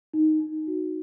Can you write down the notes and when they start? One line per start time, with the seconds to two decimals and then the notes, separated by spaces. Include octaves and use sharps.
0.14 D#4
0.40 D#4
0.67 F#4